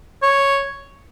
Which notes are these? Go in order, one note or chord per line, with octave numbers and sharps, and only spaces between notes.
C#5